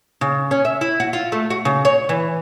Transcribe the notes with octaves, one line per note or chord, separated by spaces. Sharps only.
C#3
C#4
E5
E4
F#4
F4
A3
F#4
C#3
C#5
E3